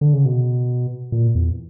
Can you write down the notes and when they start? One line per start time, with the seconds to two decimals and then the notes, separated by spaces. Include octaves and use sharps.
0.01 D3
0.13 C#3
0.25 B2
1.12 A#2
1.35 E2